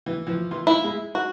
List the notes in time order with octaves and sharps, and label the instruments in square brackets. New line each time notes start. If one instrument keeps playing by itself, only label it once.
[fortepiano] E3
E3 F3
E3 F4 C6
[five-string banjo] E4 [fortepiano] E5 F5 B5
[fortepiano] G#3
[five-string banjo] F#4